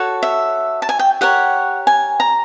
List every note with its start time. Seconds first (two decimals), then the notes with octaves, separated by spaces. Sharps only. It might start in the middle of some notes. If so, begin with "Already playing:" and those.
Already playing: F#4 A4 C#5
0.23 E5
0.82 A5
0.89 G#5
0.99 G5
1.21 G4 A#4 C#5 F#5
1.87 G#5
2.20 A#5